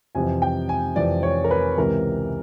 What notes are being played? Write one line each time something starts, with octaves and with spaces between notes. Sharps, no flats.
F2 C3 E3 G#5
G5
G#5
F2 C3 E3 D5
C#5
A#4
B4
C#2 C3 E3 A#4